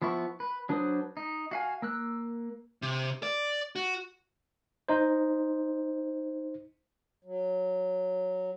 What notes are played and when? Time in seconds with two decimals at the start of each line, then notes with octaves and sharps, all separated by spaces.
0.02 F3 B3 E4 C#6
0.40 B4
0.69 F#3 D4 B4 C5 D#6
1.17 D#4
1.51 F#4 F5 G#5
1.82 A#3 E6 F#6
2.82 C3
3.23 D5
3.76 F#4
4.88 D#4 C5
7.24 F#3